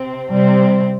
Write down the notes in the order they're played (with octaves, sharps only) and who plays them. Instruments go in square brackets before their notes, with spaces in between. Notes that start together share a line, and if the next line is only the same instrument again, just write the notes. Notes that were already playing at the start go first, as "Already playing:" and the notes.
Already playing: [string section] C3 C4
[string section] C3 C4 [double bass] G3